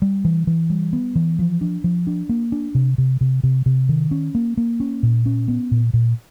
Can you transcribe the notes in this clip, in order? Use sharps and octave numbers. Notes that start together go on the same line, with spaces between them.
G3
E3
E3
G3
B3
E3
F3
D4
F3
D4
A#3
D4
C3
C3
C3
C3
C3
D#3
C#4
A#3
A#3
C#4
A#2
C#4
B3
A#2
A#2